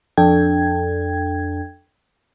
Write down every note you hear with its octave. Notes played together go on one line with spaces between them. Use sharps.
F2 D4 A4 G5 G#6